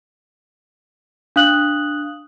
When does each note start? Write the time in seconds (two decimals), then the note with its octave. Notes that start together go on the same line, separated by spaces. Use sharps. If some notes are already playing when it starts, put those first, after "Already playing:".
1.36 D4 F5 D#6 F#6 F#7